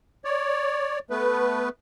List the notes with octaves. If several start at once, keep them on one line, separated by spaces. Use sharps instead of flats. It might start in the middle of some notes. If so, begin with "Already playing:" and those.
C#5 D5
A3 B3 B4